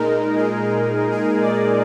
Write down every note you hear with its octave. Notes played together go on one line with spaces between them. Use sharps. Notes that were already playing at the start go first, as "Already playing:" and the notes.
Already playing: A#2 G#3 D#4 A#4
G#4
G#4
D5